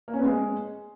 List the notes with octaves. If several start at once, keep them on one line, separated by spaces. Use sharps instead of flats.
A#3
C#4
B3
G#3